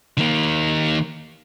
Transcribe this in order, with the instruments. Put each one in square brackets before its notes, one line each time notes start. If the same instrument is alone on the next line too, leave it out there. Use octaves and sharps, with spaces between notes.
[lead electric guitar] D#3 A#3